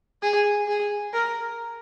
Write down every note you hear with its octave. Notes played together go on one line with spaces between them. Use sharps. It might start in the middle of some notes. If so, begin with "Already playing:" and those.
G#4
G#4
A#4